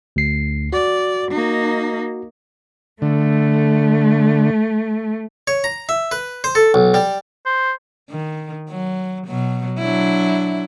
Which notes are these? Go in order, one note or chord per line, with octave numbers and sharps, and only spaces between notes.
D2 C7
F#4 D5
A#3 D#4
D3 A3
C#5
A#5
E5
B4
C5
A4
B1
G3
C5
D#3
F#3
B2 F#3
F#3 D4 E4